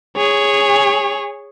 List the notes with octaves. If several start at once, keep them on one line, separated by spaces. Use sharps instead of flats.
G#4 C#5